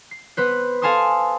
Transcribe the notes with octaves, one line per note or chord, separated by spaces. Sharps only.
C7
B3 B4 C5
A4 F5 G#5 A5 C6 D#6